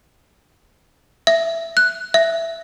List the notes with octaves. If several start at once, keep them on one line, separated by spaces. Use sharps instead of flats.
E5
F#6
E5